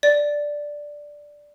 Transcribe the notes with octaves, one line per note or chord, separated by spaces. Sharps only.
D5